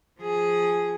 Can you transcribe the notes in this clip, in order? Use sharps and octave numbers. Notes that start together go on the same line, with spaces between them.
F3 G#4